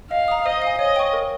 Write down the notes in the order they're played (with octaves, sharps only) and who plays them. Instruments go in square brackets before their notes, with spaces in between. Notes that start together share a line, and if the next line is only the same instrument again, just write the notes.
[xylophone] D#5 [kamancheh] F5
[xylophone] A#5 D#6
[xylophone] C5 [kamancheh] D#5
[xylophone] F5 G#5
[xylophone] C#5 [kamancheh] D#5
[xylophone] G5 C#6
A#4